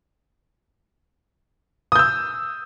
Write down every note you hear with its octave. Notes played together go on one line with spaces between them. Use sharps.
D#6 E6 G6